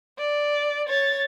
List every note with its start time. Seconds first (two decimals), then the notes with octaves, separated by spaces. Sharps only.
0.19 D5
0.89 C#5 A6